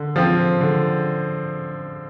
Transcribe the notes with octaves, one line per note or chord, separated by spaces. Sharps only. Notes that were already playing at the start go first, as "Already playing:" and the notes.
Already playing: D3
F3 C4
D3